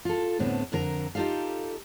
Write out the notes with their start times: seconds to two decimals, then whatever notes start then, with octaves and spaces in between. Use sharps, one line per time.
0.05 F4 A4
0.39 D2 A2 D3 B3 C4
0.72 F2 D3 A#4 A#5
1.15 D#4 F4 G4 A4 F5